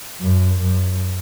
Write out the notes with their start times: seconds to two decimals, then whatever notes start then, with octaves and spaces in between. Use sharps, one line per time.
0.21 F#2
0.60 F#2